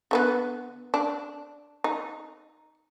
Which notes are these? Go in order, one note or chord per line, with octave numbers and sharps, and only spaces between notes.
D3 F3 B3
D4
D#4